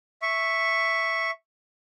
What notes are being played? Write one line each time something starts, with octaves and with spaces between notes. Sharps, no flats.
E5 C#6